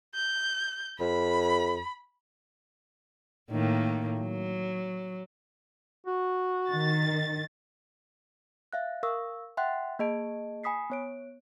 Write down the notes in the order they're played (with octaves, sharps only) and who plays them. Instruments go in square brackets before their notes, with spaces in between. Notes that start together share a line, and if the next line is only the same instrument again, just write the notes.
[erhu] G6
[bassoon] F2 [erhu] B5
[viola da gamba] A2 D#3 A#3
F#3
[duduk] F#4
[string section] D#3 A6
[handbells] E5 F5 F#6
A#4 F5 C#6 E6
E5 F#5 G5 C6 F#6
A#3 G#4 D#5 A5 D7
G#5 B5 D#6 B6 C7
B3 C#5 D7